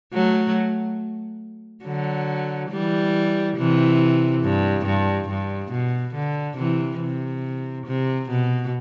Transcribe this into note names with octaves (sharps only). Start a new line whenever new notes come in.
F#3 A3
D3 F#3
E3 G3
C3 E3
G2
G2
G2
B2
D3
C3 E3
C3
C3
B2